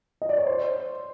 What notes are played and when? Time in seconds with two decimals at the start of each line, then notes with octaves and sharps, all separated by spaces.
0.22 D#5
0.29 D5
0.38 C#5
0.47 C5